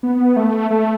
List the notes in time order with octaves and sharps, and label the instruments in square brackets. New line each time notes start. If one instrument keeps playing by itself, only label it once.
[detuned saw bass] B3
A3
A3